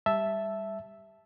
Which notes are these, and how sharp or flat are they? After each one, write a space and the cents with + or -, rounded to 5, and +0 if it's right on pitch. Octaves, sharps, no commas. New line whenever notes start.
G3 +20 E5 +0 A5 -5